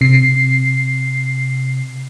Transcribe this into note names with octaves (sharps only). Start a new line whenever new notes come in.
C3 C7